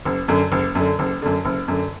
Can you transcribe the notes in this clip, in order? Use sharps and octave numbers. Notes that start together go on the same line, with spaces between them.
F#1
F#2 D3
F#1
F#2 D3
F#1
F#2 D3
F#1
F#2 D3